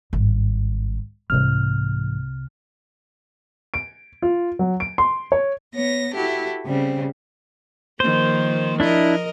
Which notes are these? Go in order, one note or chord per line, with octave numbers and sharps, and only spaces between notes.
G#1 G2
C2 G#2 C3 E3 F6
D7
F4
F#3
D7
C6
C#5
B3 C#5 A#6
E4 F#4 G4 A4
C#3 G3 C4
D#3 F3 A#3 C5
F3 D4 E4 A#4 D#5